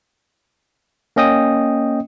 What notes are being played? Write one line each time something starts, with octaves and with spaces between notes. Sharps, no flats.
A#3 C#4 D#5 G5 D#6